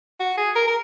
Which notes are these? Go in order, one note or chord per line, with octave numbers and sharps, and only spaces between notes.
F#4
G#4
A#4
A#4